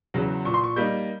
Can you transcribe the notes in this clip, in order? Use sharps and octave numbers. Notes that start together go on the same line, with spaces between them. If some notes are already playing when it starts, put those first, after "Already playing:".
E2 C#3 F#3
A#2 C#6
C6
C#6
G3 A#3 D#4 G6